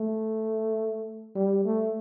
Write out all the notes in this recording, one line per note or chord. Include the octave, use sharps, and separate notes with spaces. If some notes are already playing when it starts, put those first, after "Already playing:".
Already playing: A3
G3
A3